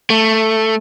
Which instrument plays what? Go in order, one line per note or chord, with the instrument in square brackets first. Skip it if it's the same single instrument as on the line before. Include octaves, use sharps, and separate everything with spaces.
[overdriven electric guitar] A3